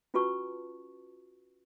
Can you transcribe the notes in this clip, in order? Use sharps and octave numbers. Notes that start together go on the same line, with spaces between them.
C#4 F4 F#4 B4 A5 C#6